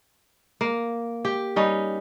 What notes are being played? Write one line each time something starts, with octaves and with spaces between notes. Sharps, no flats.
A#3
G4
G3 C#4 D#4